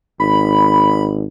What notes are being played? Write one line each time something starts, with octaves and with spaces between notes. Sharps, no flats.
G#1 B5